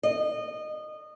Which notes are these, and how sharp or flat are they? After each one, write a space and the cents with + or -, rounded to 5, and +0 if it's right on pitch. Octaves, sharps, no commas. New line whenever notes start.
D#5 -25